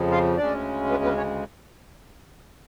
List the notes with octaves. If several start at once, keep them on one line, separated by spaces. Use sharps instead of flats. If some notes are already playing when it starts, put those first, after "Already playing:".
Already playing: F2 C#3 F3
F4 F5
D2 C#3 G#3 C#4 D4 D5
B3 B4
B3 B4
C#4 C#5